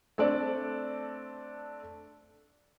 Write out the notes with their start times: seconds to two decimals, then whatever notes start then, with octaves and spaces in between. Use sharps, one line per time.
0.18 A3 C4 D4 D5